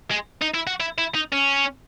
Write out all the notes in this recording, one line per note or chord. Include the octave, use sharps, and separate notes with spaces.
G#3
D#4
E4
F#4
E4
E4
D#4
C#4